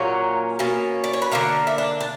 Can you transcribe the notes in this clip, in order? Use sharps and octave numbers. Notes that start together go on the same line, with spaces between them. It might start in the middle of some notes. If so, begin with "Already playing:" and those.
Already playing: A#2 F#3 A#3 C#4 G4
B2 A#3 C#4
D5
C#5
B4
D3 A#3 D4 A#4
E4
D4
D4